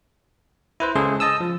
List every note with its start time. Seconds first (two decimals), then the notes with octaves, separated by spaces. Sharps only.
0.80 E4 B4 C5
0.95 C#3 G#3 G#4 A4 C5
1.20 D#5 A5 D#6 E6
1.40 F3